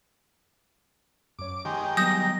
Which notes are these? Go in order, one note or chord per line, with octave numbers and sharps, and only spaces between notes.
F#2 C#5 D6
D#3 G#3 G4 C6 C#6
F#3 G3 B3 D#6 G6 A#6